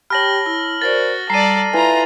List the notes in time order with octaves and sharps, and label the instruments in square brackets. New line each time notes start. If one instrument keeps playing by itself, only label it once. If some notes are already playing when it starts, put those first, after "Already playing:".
[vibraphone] G4 G5 [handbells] C#5 A5 B5 [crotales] F6 A#6 F#7
[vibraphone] E4
[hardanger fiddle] F#4 [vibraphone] A#4 C5 D5 [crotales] A6
[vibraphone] G3 [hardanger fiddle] A4 D5 [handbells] A#5 [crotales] C7 D#7
[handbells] E4 B4 G#5 [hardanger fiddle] F4 A#5 [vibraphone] E5